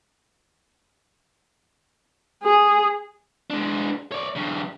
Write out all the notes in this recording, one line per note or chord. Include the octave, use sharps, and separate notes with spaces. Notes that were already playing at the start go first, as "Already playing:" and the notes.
G#4
G#3 D4
C#5 D5
G2 C#3